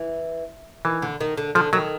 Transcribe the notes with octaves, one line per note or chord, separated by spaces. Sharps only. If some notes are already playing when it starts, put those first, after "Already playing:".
Already playing: E3
D#3 E3
D3
D#3
D3
D3 F3
D#3 F#3